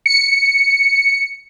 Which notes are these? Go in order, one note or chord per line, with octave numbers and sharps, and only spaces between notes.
C#7